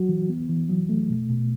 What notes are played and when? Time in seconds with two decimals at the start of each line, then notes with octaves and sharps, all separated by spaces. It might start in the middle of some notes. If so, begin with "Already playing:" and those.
Already playing: F#3 F#4
0.09 E3
0.29 B3
0.49 E3
0.69 F#3
0.89 A3
1.09 B2
1.30 B2